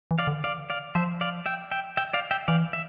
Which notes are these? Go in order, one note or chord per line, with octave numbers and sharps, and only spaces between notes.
E3
D5 F5
D3
D5 F5
D5 F5
F3 C5 E5
D5 F5
E5 G5
E5 G5
E5 G5
D5 F5
E5 G5
E3 D5 F5
E5